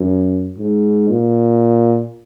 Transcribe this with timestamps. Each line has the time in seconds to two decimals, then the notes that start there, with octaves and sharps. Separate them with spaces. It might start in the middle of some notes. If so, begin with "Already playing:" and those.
Already playing: F#2
0.58 G#2
1.09 A#2